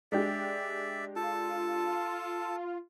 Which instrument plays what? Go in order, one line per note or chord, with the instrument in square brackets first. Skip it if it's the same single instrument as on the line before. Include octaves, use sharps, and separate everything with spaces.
[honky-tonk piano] G#3 D4 G4 [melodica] D5 E5
[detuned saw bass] F4 [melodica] A4 A5